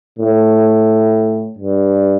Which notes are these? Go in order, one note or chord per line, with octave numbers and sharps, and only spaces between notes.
A2
G2